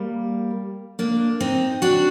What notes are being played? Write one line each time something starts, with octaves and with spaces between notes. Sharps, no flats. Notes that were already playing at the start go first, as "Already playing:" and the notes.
Already playing: G3 A#3
A#3 D4
C4 D#4
D4 F#4